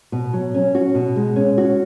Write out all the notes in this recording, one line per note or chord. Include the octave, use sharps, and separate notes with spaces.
B2
F#3
C#4
F#4
B2
G#3
C#4
F#4